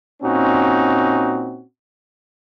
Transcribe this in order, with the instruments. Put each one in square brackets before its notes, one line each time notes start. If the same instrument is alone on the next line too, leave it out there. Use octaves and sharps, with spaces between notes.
[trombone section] A#2 C4 C#4 D#4 F#4